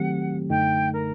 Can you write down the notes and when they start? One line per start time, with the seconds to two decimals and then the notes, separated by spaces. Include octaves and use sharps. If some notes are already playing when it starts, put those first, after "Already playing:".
Already playing: D#3 F#3 A3 C4 G4 F#5
0.50 F#2 D3 A3 D#4 G5
0.93 A#4